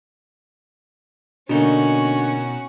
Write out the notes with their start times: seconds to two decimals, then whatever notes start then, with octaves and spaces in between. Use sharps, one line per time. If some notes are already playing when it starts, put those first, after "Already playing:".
1.49 B2 D3 A#3 C#4 D#4 F#4